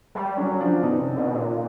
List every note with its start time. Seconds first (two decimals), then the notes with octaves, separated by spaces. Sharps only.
0.15 G3
0.37 F#3 C#4
0.60 F3 D4
0.83 B2 D#4
0.99 C3
1.16 B2
1.33 A#2